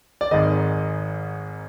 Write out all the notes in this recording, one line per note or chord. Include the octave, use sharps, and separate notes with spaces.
D5
G#1 G#2 D#3 D#5